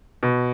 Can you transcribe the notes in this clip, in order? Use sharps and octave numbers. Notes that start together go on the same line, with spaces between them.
B2